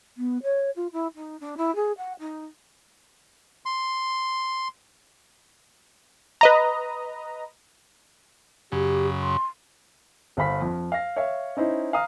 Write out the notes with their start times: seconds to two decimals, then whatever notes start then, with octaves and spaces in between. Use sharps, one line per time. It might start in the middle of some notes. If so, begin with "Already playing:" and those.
0.17 B3
0.43 C#5
0.76 F4
0.93 E4
1.15 D#4
1.40 D4
1.57 E4
1.75 G#4
1.98 F#5
2.19 D#4
3.66 C6
6.41 B4 D#5 A#5
8.72 F#2 C#3 G4
9.21 C6
10.37 G1 C5 F5 B5 B6
10.62 F2
10.92 F5 A#6
11.16 C#5 E5 F5
11.57 C#4 D#4 E4 C5
11.93 F5 A#5 D#6 F6